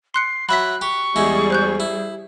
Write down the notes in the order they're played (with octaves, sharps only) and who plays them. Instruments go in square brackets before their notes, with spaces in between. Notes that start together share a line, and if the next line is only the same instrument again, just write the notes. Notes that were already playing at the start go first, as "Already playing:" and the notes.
[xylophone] C6 F#6 C#7 [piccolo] C7
[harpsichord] F#3 E5 F#5 [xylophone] B5 B6 [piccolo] F#6
[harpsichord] G4 [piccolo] C#6
[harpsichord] E2 G#3 E4 [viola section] G3 G#4
[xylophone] C5 F#6 G6
[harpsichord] E4